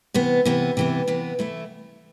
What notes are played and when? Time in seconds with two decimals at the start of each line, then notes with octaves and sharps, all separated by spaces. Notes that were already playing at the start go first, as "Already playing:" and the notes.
0.14 C3 E3 B3
0.45 C3 E3 B3
0.77 C3 E3 B3
1.08 C3 E3 B3
1.39 E3 A3 E4